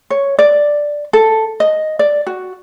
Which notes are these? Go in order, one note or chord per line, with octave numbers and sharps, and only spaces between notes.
C#5
D5
A4
D#5
D5
F#4